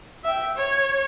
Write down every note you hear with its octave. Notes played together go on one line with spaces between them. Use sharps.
E5 G5
C#5